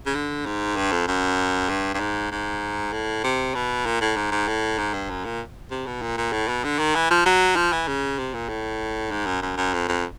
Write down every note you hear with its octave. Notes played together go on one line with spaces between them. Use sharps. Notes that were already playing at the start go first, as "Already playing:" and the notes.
C#3
D3
G#2
G2
F2
F#2
G2
G2
G#2
G#2
A2
C3
B2
A#2
A2
G#2
G#2
A2
G#2
G2
F#2
A#2
C3
B2
A#2
A#2
A2
B2
D3
D#3
E3
F3
F#3
F3
E3
C#3
C3
A#2
A2
G#2
F#2
F#2
F#2
F2
F2